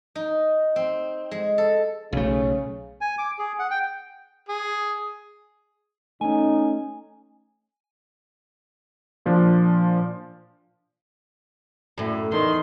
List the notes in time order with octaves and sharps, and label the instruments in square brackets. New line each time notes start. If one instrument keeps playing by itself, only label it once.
[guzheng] D#4
C4
G#3
A4
[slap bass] B1 A3 [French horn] C#3
[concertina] G#5
D6
G#4
F#5
G5
[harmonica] G#4
[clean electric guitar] A3 C#4 [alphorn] D#4 [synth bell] G#5
[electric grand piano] A#2 F3 D4 F4
[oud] F#2 A2
[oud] E2 [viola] D#3 C6